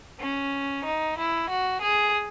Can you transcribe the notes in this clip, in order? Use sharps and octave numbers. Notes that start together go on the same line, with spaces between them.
C#4
D#4
E4
F#4
G#4